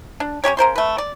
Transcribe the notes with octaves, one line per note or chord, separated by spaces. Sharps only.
D4
C#4 D4 G4 C#5
C#3 A#4 C5 C6
A3 B4
D5